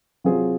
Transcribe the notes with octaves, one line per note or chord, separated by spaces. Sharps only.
C3 F#3 C4 F4 G#4